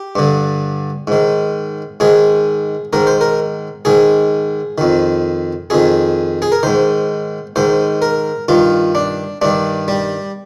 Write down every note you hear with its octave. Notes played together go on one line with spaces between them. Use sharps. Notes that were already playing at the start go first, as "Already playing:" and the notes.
Already playing: G4
G2 D3
G#2 D#3
G#2 D#3 G#4
G#2 D#3 A#4
C5
A#4
G#2 D#3 G#4
F2 D#3
F2 D#3 G#4
G#4
A#4
G#2 D#3 C5
G#2 D#3 C5
A#4
G2 D#3 F4
D4
G2 D#3 D4
G3